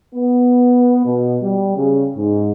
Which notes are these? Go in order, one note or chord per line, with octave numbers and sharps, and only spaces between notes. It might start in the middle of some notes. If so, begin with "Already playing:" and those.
B3
B2
G3
C#3
G#2